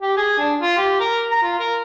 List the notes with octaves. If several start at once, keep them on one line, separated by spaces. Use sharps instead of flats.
G4
G#4
D4
F4
G4
A#4
A#5
F4
A#4